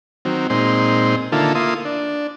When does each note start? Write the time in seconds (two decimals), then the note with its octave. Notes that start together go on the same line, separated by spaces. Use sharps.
0.25 D#3 F#3 C4
0.50 A#2 G#3 C4 D#4 C6
1.32 D3 D#3 A#3 E4 F4 A4
1.55 A#3 E4 F4 C6 D#6
1.85 D4